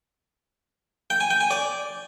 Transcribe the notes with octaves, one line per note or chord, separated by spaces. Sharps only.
G5
G#5
G5
G#5
D5